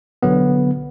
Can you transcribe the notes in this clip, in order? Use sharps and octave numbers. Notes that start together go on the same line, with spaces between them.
B1 D3 F#3 B3